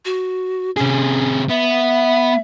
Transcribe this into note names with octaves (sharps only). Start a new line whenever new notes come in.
F#4
C3 C#4 G#4
B3 E5